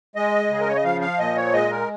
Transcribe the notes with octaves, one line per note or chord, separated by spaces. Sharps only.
G#3 D#5
C#3 G#4
A#4
C#5
D#5
F3 F5
F5
A#2 D#5
C#5
G#3 D#5
A#4